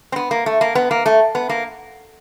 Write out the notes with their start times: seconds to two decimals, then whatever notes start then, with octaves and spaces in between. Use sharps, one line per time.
0.12 C4
0.16 B3
0.31 A#3
0.46 A3
0.61 A#3
0.75 B3
0.91 A#3
1.06 A3
1.35 B3
1.49 A#3